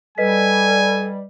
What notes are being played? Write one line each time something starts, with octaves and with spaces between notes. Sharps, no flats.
G3 A4 B4 D#5 G#5 B6